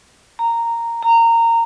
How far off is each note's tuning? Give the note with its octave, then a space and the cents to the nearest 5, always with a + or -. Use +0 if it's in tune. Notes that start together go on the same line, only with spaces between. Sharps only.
A#5 -10
A#5 -20